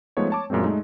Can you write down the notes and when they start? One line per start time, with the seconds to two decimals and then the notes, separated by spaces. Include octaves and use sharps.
0.17 F3 G#3 A3 B3 D#4 C#5
0.30 C#5 A5 D6
0.50 F#2 A#2 G#3 A3 C4
0.63 G#3 A3 D#4